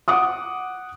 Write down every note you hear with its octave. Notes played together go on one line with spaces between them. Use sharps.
F#5 D6 D#6